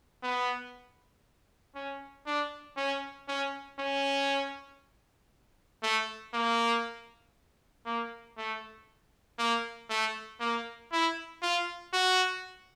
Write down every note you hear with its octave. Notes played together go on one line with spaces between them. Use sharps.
B3
C#4
D4
C#4
C#4
C#4
A3
A#3
A#3
A3
A#3
A3
A#3
E4
F4
F#4